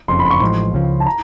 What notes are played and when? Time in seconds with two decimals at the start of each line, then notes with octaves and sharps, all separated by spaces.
0.08 F#1 F2 C#3 C6
0.19 B5
0.25 C6
0.30 C#6
0.41 A1 A2 F3 G#3 C6
0.74 C#2 C#3 F3
1.00 A5
1.06 A#5